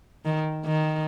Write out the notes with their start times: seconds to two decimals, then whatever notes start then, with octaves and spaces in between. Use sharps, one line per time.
0.25 D#3
0.65 D#3